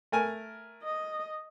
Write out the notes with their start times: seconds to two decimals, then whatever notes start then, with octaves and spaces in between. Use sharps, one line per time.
0.12 A3 A#4 G#5
0.83 D#5